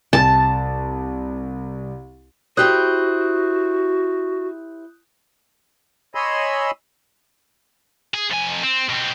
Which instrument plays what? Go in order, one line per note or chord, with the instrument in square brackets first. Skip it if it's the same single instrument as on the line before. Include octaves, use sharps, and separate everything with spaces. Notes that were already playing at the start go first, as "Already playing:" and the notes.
[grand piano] C2 A6 [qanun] A5
[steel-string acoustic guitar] E4 G4 C5 [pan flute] F#4 [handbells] D#6 F#6 G6
[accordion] C#5 D#5 G#5 B5 C6 E6
[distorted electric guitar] G#4
F2 G#5
C4
B2 C4